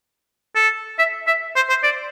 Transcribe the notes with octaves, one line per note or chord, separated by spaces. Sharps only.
A4
E5
E5
C5
C5
D5